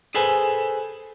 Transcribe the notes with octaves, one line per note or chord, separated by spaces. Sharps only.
G#4 A4 B4 C5 G#5